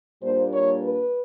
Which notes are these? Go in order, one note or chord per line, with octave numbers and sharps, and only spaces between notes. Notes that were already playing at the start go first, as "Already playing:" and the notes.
A#2 G3 A#3 D4 C5
C#5
B4